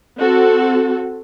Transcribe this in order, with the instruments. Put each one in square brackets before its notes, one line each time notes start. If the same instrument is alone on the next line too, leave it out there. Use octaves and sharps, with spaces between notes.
[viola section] C4 F#4 A4